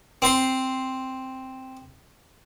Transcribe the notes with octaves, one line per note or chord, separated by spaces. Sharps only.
C4 C6